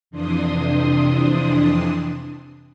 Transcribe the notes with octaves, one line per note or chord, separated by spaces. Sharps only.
F2 C3 E3 D4 C6 D#6